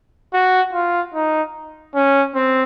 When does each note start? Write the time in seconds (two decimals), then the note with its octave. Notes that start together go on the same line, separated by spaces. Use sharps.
0.33 F#4
0.73 F4
1.14 D#4
1.95 C#4
2.35 C4